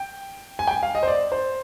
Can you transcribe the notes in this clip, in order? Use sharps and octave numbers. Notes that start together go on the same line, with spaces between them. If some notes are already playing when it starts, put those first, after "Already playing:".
Already playing: G5
G#5
G5
G#5
F5
D#5
C5
D5
C5